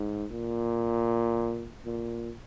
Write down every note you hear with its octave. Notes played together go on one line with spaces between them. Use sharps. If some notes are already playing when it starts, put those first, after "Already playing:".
Already playing: G#2
A#2
A#2